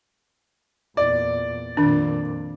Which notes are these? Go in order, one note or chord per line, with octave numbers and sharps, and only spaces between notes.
E2 A#2 D5
F2 A#2 D#3 D4